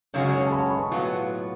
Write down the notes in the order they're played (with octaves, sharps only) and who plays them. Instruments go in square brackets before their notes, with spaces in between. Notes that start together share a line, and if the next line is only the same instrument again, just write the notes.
[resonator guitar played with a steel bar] F#2 C#3 G#3 C#4 F#4 [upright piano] C#5
[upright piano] C#5
A5
B5
C#6
[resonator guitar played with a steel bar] A2 F#3 B3 F4